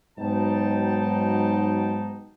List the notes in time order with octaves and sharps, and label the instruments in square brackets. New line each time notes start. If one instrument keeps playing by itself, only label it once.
[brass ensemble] G#2 B2 F#3 D#4 G5 A5